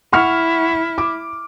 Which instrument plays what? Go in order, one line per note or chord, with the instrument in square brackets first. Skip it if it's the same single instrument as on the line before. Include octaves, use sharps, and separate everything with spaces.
[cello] E4 [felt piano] F#5 C#6 F6
[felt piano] D6